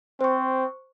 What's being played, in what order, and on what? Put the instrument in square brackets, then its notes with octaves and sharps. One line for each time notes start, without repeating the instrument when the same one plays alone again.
[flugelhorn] C4 [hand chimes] C5 C#6